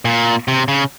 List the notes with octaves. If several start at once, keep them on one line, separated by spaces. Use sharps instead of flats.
A#2
C3
C#3